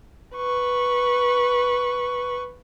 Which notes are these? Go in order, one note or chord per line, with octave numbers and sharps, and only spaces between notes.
B4 C#6